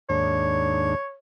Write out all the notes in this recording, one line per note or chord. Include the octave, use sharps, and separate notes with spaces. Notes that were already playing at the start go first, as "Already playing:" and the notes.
D#2 G#2 D4 C#5